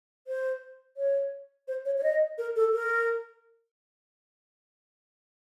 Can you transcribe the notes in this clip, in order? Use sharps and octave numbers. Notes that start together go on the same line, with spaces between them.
C5
C#5
C5
C#5
C#5
D#5
A#4
A4
A#4